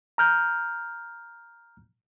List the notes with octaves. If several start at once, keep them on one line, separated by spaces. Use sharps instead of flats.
A#5 F6 G6